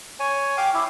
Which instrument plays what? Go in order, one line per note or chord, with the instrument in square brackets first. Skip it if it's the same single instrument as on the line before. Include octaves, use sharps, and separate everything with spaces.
[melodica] C#5 G#5
[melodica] F5 D6 [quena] G5
[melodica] E4 [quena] D6